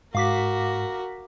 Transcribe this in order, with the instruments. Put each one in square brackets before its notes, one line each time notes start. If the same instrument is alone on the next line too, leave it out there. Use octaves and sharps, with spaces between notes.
[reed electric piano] G#2 [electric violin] F#4 A#4 [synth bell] F5 D6 B6